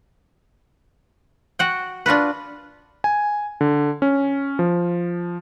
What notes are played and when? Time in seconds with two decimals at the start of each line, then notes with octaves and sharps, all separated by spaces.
1.59 F#4 F#5 G5
2.06 D4 F4 F#4 B4
3.04 G#5
3.61 D3
4.02 C#4
4.59 F3